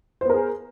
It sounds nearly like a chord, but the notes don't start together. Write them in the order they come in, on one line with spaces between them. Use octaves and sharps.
C5 B3 A#4 G#4